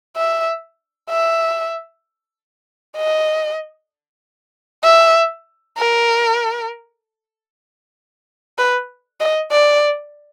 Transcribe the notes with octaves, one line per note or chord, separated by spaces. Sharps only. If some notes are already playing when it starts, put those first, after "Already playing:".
E5
E5
D#5
E5
A#4
B4
D#5
D5